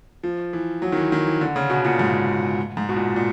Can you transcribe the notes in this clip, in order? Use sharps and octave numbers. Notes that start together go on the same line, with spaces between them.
F3
E3
F#3
D#3
E3
D#3
E3
D3
C#3
B2
A#2
G#2
G#2
B2
A#2
A#2